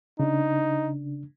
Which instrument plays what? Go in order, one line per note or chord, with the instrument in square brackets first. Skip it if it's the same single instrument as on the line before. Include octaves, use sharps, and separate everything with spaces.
[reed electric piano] C#3 D4 [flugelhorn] D#4